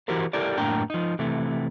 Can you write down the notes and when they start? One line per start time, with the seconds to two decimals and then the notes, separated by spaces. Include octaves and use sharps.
0.08 E3 E4 F#4 G4 A#4 C5
0.33 E4 G4 A4 A#4 D5
0.57 F#2 A2 A#3 D4 G5 A#5
0.90 F3 D#4
1.19 C3 E3 A3